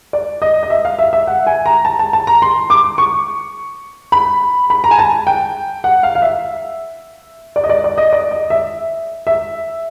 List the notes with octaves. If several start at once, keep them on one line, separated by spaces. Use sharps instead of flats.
D5
D#5
D#5
E5
F5
E5
E5
F#5
G#5
A#5
A5
A5
A5
A#5
C6
D6
C#6
B5
B5
A#5
G#5
A5
G5
F#5
F5
F5
E5
D5
D#5
D5
D5
D#5
D5
D#5
E5
E5